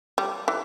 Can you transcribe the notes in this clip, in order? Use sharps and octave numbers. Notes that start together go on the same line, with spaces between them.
G3
E3